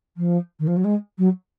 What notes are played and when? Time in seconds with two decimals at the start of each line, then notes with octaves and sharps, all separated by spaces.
0.17 F3
0.59 D#3
0.67 F3
0.76 F#3
0.84 G#3
1.18 F#3